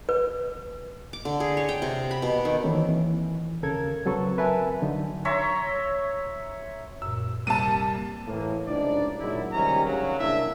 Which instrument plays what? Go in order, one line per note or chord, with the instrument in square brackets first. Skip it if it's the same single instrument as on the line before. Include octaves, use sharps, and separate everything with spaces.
[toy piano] B4
[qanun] D6
D3
G#4
C#5
G5
C3
B5
B2
D#3
[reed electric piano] D#3 E3 A#3 C4 A4 C#5
E3
D#2 C#3 A4 A#4 G#6
C#3 F#3 C4 A4 B4 C#6
A#4 B4 E5 G#5 A5
D3 F#3 D#4
[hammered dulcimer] C#5 E5 A#5 C6
[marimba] F#2 A#2 [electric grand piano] E6
[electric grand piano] C3 G3 A#3 [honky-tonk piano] A5 D#7
[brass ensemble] A2 E3 A#3
C#2 C3 D4 D#4 D5
A#2 D#3 F#3 G#3 E4
C#2 C3 D#3 G3 C#4 A#5
D2 C#3 F#3
C2 A#3 D4 E4 A4 E5